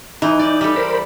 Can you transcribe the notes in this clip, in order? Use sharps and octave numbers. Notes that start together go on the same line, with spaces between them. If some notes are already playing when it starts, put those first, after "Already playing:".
E3 D#4
D5
G3 A4
A#4 C5 B5